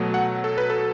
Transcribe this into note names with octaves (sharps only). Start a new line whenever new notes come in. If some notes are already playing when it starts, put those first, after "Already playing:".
Already playing: B2 F#3 A3
F#5
A4
B4
A4